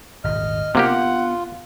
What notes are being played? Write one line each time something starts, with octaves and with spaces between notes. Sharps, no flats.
D#1 G#1 D#5 F6
C3 A#3 B3 D4 F4 G4 F#5